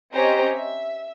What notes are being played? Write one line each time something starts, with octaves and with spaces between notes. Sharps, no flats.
C4 C#4 G4 C5 D#5 A#5
E5